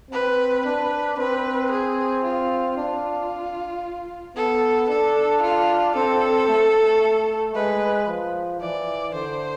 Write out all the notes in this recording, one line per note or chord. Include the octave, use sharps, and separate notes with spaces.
C4 B4
D4 B4
C4 B4
G#4
F4
D4 F4
B3 A4
D4 A4
F4
C4 A4
A3
A3
G#3 B4
F3
E3 D5
D3 C5